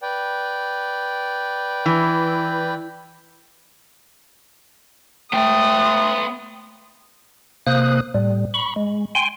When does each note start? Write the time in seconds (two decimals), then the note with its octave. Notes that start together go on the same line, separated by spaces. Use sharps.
0.02 B4 D5 G5
1.86 E3
5.33 A3 B3 G5 D#6
7.67 C3 A#3 C5 D#6 F#6
8.14 A2 G3
8.54 B5 C#6
8.76 G#3
9.15 G5 G#5 C6